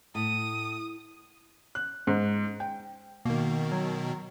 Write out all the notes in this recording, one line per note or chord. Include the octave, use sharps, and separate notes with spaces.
A2 D#6
F#6
G#2
G5
B2 D#3 A#3
F#3